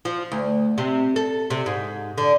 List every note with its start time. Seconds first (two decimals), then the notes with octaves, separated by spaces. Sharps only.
0.05 F3
0.32 D2
0.78 C3
1.16 A4
1.50 C3
1.66 G#2
2.18 D3